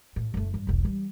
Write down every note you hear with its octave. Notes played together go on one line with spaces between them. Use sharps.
A2
F#1 A3
G2
E1 B1
E3 G3